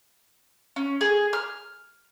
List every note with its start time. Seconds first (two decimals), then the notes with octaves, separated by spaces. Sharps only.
0.76 C#4
1.01 G#4
1.33 F6